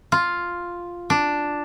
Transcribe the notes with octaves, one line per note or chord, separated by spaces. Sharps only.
F4
D4